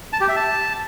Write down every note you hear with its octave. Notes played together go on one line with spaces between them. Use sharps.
A5
G4
E5
A5